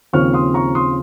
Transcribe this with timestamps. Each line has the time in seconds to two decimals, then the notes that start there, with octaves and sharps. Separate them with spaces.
0.13 D#2 C#3 F3 C4 C#6 F6
0.34 C6 D#6
0.54 A#5 C#6
0.75 C6 D#6